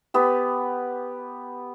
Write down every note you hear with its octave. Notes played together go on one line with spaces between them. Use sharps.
B3 G4